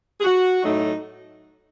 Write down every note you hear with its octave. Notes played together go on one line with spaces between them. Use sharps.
G#4
F#4
A2 F#3 A3 D#4